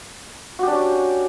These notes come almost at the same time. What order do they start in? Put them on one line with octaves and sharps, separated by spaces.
F#4 G4 D4 C#4